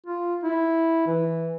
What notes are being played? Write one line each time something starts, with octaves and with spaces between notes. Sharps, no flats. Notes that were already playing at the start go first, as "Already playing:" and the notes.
F4
E4
E3